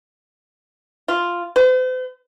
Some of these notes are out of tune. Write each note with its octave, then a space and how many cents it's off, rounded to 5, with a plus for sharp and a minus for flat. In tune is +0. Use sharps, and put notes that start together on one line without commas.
F4 +0
C5 -45